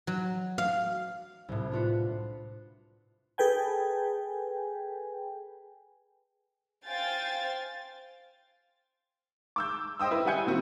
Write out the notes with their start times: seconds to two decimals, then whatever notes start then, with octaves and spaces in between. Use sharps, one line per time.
0.07 F#3
0.58 F5
1.49 C2 A2
1.72 D4 F4 F#4 B4
3.38 G#4 A4 B4 G5 G#5
6.86 C5 F5 G5 G#5 A6
9.56 D6 E6 G6
10.00 C5 D#5 G5 D#6 E6
10.11 E4 B4
10.26 G3 E4 F#5 G#5 G6 C#7
10.47 A#2 D#3 C4 E4 F#4